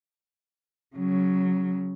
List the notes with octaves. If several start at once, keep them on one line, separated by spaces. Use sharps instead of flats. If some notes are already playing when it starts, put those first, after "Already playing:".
C#3 F#3